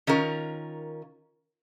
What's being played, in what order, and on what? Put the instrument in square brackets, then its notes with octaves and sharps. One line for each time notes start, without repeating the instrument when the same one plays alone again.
[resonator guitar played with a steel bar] D#3 C#4 F4 A#4